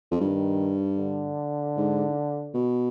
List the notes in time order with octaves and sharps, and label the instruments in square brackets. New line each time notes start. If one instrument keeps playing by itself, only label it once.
[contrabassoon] F2
[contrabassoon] G2 [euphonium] D#3
[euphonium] D3
[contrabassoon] G#2
B2